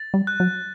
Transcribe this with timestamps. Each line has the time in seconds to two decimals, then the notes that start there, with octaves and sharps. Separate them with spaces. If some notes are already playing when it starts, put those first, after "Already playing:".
Already playing: A6
0.14 G3
0.27 F#6
0.40 F#3